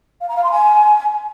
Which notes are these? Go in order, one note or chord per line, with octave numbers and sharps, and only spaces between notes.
F5
A#5
F5
C6
G#5